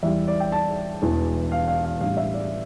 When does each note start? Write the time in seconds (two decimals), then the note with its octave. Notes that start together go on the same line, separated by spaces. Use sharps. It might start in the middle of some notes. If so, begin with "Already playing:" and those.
0.03 E2 E3 G3 E5
0.28 D5
0.40 G5
0.52 A5
1.02 E1 E2 E3
1.52 F5
1.68 F5
1.84 F5
2.00 A1 A2 G3 D4 F5
2.17 E5
2.34 D5